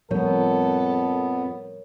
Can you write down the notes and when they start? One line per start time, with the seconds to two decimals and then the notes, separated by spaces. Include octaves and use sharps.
0.11 F2 A2 F3 G3 B3 A4 A#4 C#5